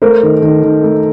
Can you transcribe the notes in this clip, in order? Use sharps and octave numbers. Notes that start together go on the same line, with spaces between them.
A3 A#4 C5
D#3
D#3
D#3
A3